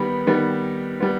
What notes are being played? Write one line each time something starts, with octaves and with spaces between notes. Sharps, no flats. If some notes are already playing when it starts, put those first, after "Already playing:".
Already playing: D#3 G3 B3 B5
D#3 G3 B3
G3 B3